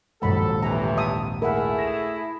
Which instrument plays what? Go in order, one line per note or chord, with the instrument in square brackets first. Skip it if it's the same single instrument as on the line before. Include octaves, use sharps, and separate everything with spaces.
[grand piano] A#1 D#2 G#2 [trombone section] F#3 A4 [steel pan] F#5 B5
[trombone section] A2 C3 E3 [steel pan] A#5
[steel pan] E5 A5 D#6
[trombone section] A3 G#4 [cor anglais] E4 [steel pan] A#4 E5 F#5
[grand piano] A#6 E7